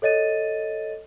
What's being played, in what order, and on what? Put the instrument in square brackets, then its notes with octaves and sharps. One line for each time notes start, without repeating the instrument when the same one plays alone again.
[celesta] A4 C#5 D#5 A6 D#7